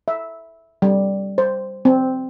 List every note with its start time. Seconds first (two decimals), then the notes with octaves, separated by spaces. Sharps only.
0.08 E5
0.82 G3
1.38 C5
1.85 C4